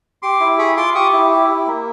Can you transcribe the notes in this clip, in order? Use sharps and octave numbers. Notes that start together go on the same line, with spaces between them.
G4 C6 D6
E4
G#4 B5 C#6
F4 C6 D6
G4 C#6 D#6
E4
G4
E4
A#3